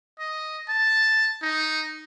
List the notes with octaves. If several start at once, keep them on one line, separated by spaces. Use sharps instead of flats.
D#5
A5
D#4